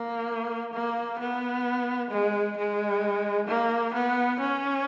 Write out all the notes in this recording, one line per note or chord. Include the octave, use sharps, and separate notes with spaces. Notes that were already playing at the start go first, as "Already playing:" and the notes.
Already playing: A#3
A#3
B3
G#3
G#3
A#3
B3
C#4